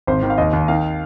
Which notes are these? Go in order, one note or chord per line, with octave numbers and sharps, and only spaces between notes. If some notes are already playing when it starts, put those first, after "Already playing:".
G#1 C5
D#3
F5
D#2 D#5
D#2
D#3 F5